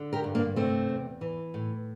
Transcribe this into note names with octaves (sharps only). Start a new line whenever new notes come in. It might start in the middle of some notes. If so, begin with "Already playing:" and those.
Already playing: D3
G4 A#4
G2
A#3 D4
C3 A3 C4
E2
E3
A2